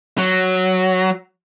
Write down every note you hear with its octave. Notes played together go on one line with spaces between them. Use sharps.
F#3